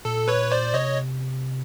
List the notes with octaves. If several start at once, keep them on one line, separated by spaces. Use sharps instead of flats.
A#2 A4
B4 C#5
C5 D5
C3 C#5 D#5